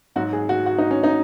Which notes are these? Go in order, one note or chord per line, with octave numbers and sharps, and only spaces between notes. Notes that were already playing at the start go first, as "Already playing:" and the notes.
G#2 F#3 F#4
G#4
F#4
F#4
D#4
C#4
D#4